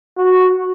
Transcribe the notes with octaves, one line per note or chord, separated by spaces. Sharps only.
F#4